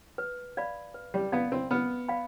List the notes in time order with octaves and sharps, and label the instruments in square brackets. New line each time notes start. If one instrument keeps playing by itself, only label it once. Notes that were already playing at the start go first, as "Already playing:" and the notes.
[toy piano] B4
D5 F5 B5
B4
[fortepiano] G3
[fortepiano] B3 [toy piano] D5 F5 B5
[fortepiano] C4
[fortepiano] B3 [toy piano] B4
[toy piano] D5 F5 B5